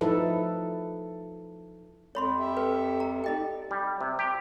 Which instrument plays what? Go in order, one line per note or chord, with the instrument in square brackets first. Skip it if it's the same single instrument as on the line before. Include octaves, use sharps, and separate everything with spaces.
[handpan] F3 D#4 E4 A4 B4
[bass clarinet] F2 [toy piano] C#5 B5 C6
[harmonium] G4 E5
[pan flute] A4 [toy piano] B4
[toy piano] A#5
[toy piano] D#4 D#5 G5 [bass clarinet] G4 [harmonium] D5
[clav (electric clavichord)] G3
C3
G4